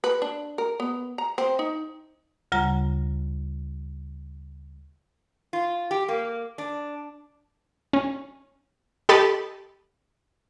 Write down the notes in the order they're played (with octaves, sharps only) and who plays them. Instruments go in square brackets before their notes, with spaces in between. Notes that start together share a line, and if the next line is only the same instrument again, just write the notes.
[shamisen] B4
D4
A#4
B3
A#5
C4
D#4
[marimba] D2 C#3 G3 F4 A#5 A#6
[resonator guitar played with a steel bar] F4
G4
A#3
D4
[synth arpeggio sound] C#4
G4 A4 D#5 A5 B5